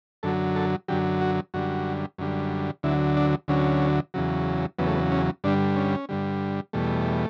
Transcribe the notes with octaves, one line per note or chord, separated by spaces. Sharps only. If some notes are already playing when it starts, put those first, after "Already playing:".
F#2 D3 F#3 A4
A4
F#2 D3 F#3 G4
F#4
F#2 D3 G3 F#4
F#2 D3 G3
D2 D3 F#3 E4
D4
D2 D3 F#3 C#4
E2 C#3 F#3
E2 C#3 F#3 B3
A3
B3
C#4
G2 D3 G3 D4
C#4
G2 D3 G3
E2 B2 G3 A3